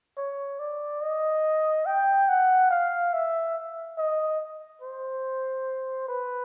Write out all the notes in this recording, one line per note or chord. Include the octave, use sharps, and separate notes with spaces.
C#5
D5
D#5
G5
F#5
F5
E5
D#5
C5
B4